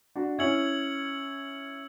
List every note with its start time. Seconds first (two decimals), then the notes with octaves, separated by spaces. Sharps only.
0.16 D4 F#4
0.38 C#4 E4 E6 G#6 C#7 F#7